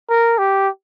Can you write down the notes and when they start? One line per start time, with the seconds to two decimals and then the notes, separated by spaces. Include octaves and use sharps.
0.10 A#4
0.39 G4